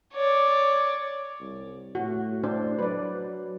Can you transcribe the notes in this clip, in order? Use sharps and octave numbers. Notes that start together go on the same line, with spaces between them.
C#5 D5
C2
A2 F#4
D4 C5
F#3 B4 D5